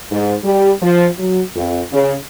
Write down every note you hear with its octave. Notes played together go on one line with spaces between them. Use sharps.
G#2
G3
F3
F#3
F2
C#3